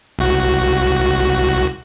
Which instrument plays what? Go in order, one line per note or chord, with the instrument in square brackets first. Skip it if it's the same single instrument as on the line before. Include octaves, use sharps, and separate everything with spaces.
[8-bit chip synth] C2 F#4